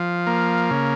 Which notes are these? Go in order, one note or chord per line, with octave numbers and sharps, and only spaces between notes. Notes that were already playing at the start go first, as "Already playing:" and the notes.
Already playing: F3
A#3
C#3